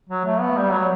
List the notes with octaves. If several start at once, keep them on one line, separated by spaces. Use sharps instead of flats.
F#3
A3
B3
G3
F#3